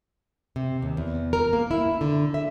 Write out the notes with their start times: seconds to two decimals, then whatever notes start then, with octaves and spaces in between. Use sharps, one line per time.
0.56 C3
0.82 D#2
0.97 E2
1.33 A#4
1.53 A#3
1.71 E4
2.01 D3
2.34 E5